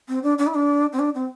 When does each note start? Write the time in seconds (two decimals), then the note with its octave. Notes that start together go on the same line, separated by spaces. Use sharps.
0.08 C4
0.23 D4
0.38 D4
0.47 E4
0.55 D4
0.93 C4
0.99 D4
1.15 C4